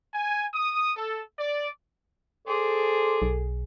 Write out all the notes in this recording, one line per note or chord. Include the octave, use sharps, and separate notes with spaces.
G#5
D#6
A4
D5
G#4 A4 C5 D5
B1